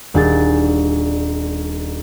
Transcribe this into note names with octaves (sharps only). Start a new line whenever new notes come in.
D#1 D4 G#4 G6 A6